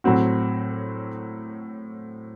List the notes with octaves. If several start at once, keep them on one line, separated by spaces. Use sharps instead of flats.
A2 F#3 C4 F#4